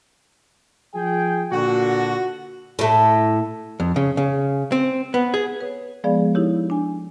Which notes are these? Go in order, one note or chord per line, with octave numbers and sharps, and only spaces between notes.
F3 G#4 G5
A#2 D3 F#4
A2 A3
F2
C#3
C#3
C4
B3
G#4
B4 C#5
F3 G#3 B3 G#4 D5 F5
D#4 E4 G4 A4 C#5
D4 G#5